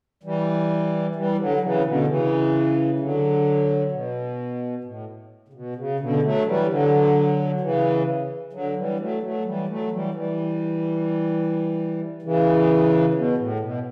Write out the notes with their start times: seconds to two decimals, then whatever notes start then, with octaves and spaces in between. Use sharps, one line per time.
0.23 E3 G3
1.15 E3 G3
1.38 D3 F#3
1.57 D3
1.61 C#3 E3
1.85 B2 D3
2.07 C#3 E3
3.00 D3 F#3
3.92 B2
4.84 A2
5.48 C#3
5.53 B2
5.76 C#3
6.00 B2 D3
6.22 F#3 A3
6.46 E3 G3
6.68 D3 F#3
7.60 C#3 E3
8.53 D3 F#3
8.76 E3 G3
9.00 F#3 A3
9.22 F#3 A3
9.45 E3 G3
9.69 F#3 A3
9.92 E3 G3
10.14 E3 G3
12.22 C#3 E3
13.14 B2
13.38 A2
13.60 B2